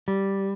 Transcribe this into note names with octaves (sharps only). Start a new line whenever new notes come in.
G3